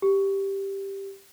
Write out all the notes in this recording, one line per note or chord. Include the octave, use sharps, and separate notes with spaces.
G4